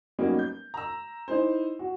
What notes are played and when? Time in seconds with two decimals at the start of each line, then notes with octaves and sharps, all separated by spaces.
0.19 F#3 G3 A#3 B3 C#4 D#4
0.39 G6
0.74 A#5 E6
1.28 D#4 E4 C5
1.79 F#4